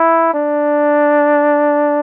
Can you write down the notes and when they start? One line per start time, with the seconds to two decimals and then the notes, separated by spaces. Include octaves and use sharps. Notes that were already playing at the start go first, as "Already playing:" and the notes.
Already playing: E4
0.34 D4